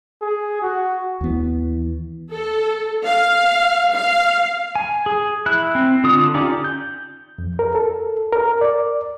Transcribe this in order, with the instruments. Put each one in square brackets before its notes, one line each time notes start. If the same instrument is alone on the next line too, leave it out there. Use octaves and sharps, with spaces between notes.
[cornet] G#4
F#4
[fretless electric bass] D#2 B3 [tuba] E3
[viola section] A4
F5
F5
[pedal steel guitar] G#5
G#4
E4 F#6
C4
D3 F4 D#6
C#4 D#4 F4 G4 D5
[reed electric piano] G6
F2
A#4
A4
A#4
D5